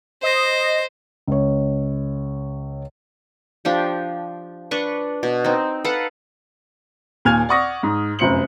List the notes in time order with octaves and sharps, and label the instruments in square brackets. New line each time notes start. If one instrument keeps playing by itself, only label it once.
[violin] C5 [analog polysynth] D#5 A#6
[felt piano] C#2 C#5
[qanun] F3 D4 G4
D4 B4 C#6
B2
C4 D#4
A4 B4 F5 F#5
[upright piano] D#2 A#2 G#5 F6 G#6 F7
D5 F#5 C#6 D#6 A#6
G#2
F1 F#2 C5 C#7 F#7